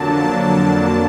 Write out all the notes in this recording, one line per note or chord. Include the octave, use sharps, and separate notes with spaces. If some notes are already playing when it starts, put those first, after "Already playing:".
Already playing: F2 D3 F#3 A#3 D4 A5